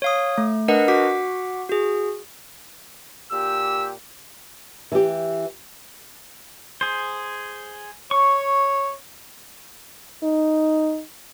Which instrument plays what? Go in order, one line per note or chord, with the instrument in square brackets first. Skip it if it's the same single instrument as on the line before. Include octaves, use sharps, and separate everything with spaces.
[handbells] C#5 F5 D#6
A3
D4 A#4 B4 D#5 F#5
F#4 F#5 D6 B6
F#4 G#4
[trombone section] A#2 G4 [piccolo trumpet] E6
[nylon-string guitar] E3 G4
[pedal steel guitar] G#4 C5
[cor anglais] C#5 [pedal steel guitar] C#6
[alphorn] D#4